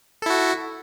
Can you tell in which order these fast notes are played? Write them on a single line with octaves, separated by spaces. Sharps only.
A4 E4 F#4